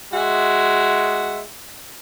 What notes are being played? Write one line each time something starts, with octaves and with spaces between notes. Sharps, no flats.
G#3 F#4 E5